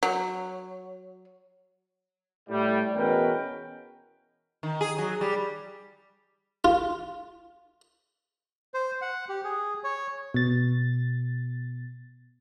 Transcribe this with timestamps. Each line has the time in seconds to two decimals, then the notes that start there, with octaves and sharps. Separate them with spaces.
0.03 F#3
2.50 A2 G3
2.96 E2 B2 C#4 A#4 B4 G5
4.63 D#3
4.81 G#4
4.98 F#3
5.21 G3
6.65 F4
8.74 C5
9.02 F#5
9.29 G4
9.44 G#4
9.84 C#5
10.34 B2 A6